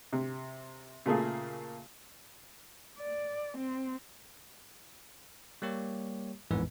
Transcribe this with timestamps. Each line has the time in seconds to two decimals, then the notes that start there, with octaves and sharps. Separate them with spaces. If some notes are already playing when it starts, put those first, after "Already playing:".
0.13 C3
1.06 A#2 C#3 A3 A#3 G#4
2.99 D5
3.57 C4
5.62 G3 A#3 G4 C#5
6.51 A1 F2 G#2 E3 B3 B4